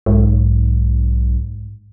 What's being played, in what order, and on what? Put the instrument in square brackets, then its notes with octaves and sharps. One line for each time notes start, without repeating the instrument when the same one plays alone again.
[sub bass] B1 [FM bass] G#2